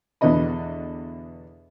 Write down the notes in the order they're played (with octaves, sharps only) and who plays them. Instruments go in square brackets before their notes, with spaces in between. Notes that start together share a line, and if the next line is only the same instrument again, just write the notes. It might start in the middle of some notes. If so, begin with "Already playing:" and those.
[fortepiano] E2 B2 D3 B3 D#5 B5